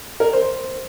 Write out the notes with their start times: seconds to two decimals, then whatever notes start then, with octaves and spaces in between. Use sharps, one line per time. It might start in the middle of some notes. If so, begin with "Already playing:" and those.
0.20 A#4
0.33 C5